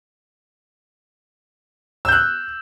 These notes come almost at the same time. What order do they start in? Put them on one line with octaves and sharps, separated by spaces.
E6 G6 F#6